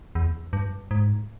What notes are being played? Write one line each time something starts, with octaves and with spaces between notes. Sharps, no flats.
E2
G2
G#2